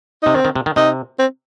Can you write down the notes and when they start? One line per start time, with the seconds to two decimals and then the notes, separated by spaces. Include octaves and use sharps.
0.23 C3 D#4
0.35 D#3 C4
0.45 D#3
0.56 C3
0.66 D#3
0.76 C3 D#4
1.19 C4